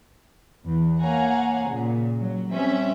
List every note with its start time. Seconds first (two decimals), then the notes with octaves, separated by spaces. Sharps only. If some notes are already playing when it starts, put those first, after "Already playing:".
0.65 E2
1.02 A#3 C#5 F5 F#5 G#5 A#5
1.67 A#2 C#3
2.19 F#3
2.52 G3 C4 C#4 E5